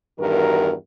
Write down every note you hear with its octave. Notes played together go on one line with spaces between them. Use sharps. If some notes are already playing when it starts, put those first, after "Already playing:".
E2 G2 D#3 F#4 A#4